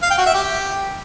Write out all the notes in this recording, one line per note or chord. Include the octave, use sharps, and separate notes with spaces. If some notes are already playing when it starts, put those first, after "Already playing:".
F5
G5
F#4
E5
G4